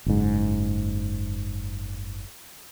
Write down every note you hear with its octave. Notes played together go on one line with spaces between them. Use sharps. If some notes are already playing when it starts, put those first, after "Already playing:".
F#1 G#2